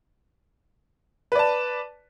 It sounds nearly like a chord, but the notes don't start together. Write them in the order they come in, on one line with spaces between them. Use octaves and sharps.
B4 D5 A5